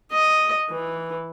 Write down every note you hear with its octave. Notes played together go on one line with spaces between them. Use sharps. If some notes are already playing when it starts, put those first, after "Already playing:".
D#5
E3